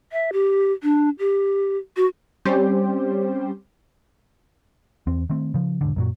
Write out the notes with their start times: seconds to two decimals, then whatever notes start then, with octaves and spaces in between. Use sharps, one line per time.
0.12 E5
0.33 G4
0.83 D4
1.19 G4
1.96 F#4
2.45 G3 C4 C#4 G4 C5
5.07 E2 C4
5.30 D#3 A3 C4
5.54 C#3 F3
5.81 E1 G#2 D3
5.96 F#2 A#2 F#3